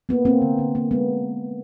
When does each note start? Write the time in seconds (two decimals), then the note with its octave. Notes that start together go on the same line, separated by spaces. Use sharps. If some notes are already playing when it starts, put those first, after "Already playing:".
0.09 A#3 B3
0.25 A#3 C4
0.42 D3
0.59 D3
0.75 A#3
0.91 G#3 B3